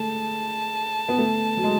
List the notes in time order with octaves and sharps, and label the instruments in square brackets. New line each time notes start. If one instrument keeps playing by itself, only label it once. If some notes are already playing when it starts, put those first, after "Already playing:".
Already playing: [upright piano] G#3 A3 [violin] A5
[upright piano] B3
A3
F#3
G#3